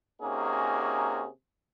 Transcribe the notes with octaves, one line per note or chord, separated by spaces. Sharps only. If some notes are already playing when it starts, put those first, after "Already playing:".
C3 A#3 C#4 D#4 F#4 G#4